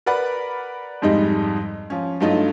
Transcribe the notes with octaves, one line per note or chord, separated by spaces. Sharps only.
A#4 B4 D5 F#5 B5
F2 G#2 G3 G#3 D#4
F3 C#4
G2 F#3 A3 D#4 F4